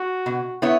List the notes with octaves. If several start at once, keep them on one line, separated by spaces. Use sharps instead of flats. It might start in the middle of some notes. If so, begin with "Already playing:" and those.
Already playing: F#4
B2
B3 E4 C#5